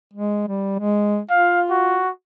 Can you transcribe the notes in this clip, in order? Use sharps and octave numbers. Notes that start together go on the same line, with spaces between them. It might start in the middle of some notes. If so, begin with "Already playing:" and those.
G#3
G3
G#3
F4 F5
F#4